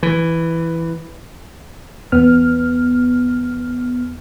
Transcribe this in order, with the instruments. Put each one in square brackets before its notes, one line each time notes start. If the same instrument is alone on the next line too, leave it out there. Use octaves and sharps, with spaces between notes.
[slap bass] E3
[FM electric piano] E2 B3 F6